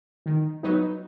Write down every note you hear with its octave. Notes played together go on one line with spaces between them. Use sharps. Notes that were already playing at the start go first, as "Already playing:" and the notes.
D#3
F#3 B3 D#4